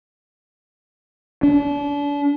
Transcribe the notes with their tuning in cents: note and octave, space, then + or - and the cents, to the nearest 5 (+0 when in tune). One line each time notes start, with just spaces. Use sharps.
D4 -35